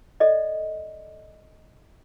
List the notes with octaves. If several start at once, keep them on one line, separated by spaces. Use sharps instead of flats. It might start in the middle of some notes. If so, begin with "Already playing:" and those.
A4 D5 D#5